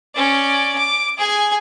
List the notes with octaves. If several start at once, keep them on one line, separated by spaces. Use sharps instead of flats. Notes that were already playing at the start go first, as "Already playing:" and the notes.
C#4 D5
D6
G#4 G#5